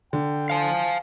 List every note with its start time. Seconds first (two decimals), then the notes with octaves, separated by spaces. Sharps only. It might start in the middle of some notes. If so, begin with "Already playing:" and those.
0.13 D3 G5
0.50 F5 G#5 A5